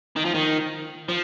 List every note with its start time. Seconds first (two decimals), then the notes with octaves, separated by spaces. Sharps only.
0.16 D#3
0.25 F3
0.35 D#3
1.09 F3